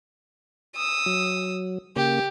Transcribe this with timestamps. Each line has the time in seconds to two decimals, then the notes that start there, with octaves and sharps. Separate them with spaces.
0.76 D#6 E6
1.06 F#3
1.96 C#3 A#3 G4